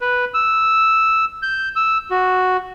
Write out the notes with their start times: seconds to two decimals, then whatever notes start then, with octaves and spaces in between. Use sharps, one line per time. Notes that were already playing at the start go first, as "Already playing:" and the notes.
0.01 B4
0.34 E6
1.42 G6
1.76 E6
2.10 F#4